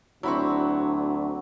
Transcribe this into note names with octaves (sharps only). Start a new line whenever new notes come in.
D2 F#3 C4 D4 E4 B5 C#6